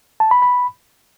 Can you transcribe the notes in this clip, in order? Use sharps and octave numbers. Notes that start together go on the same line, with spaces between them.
A5
B5
B5